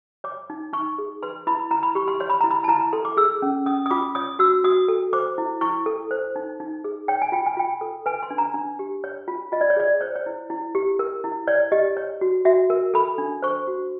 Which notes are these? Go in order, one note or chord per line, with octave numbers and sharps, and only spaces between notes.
C#5 D6
D#4
D#4 C#6
G#4
B4 C6
E4 B5
E4 A#5
B5
G4 C#6
C6
C#5 C6
B5
E4 A#5
B5
A5
E4 A#5
A#5
A4 C6
D6
G#4 E6
C#4
C#4 D#6
D#6
F4 D6
C#5 D#6
F#4 E6
F#4 D#6
A4
C5 D6
E4
E4 C#6
A4
C5
D#4
D#4
G#4
C#5 G5
G#5
F4 G5
G#5
F4 G5
A4
B4 G#5
C6
D4
A#5
D4
G4
C#5
F4
F4 D#5
D5
C#5
G#4 D5
C5 C#5
C#5
E4
E4
G4
A#4
E4
C#5 D5
G4 D#5
C#5
F#4
F#4 E5
A#4
A4 B5
D4
C5 C#6
F#4